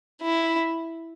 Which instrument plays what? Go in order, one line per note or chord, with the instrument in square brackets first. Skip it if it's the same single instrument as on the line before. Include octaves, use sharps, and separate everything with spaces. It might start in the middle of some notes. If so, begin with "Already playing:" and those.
[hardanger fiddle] E4